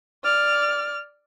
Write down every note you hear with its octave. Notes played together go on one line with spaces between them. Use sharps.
D5 F6